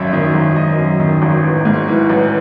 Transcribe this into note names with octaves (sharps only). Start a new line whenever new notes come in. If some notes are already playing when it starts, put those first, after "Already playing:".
Already playing: G#1 F#2 E5
D#3
G#1
G#1 D#5
F#2
D#3
G#1
A1
G#2
E3
A1